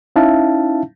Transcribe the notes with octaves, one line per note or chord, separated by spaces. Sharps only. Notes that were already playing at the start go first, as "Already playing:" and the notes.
C#4 D#4 E4 E5 F5 A5